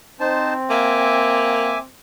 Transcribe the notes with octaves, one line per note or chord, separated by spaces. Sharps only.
C4 D#4 C5 A5
A#3 E5 G#5 D6